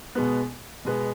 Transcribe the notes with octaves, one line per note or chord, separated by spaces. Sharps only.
B2 G#3 B3
B2 G#3 B3